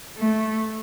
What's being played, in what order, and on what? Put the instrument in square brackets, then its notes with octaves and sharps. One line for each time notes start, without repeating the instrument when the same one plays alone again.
[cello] A3